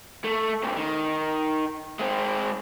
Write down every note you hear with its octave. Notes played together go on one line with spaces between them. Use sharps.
A3
G#2 C3
D#3
G#3 C4